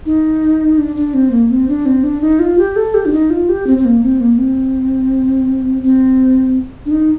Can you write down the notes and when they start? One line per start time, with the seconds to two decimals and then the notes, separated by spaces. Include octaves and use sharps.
0.06 D#4
0.78 D4
0.96 D4
1.14 C4
1.31 A#3
1.50 C4
1.68 D4
1.86 C4
2.03 D4
2.21 D#4
2.39 F4
2.59 G4
2.76 A4
2.94 G4
3.06 D4
3.13 D#4
3.30 F4
3.49 G4
3.67 C4
3.78 C4
3.85 A#3
4.03 C4
4.20 A#3
4.38 C4
5.83 C4
6.86 D4
6.91 D#4